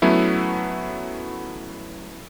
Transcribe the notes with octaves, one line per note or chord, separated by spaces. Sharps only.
F#3 A3 B3 C#4 E4